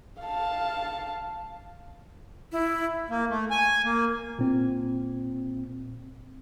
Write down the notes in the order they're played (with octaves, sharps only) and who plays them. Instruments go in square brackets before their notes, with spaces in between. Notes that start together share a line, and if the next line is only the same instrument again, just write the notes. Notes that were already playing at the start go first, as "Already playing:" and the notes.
[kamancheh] F5 A5
[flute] E4
[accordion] A#3
A3
G#5
A#3
[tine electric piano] A#2 C4